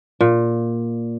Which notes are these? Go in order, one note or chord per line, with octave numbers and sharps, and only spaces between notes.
A#2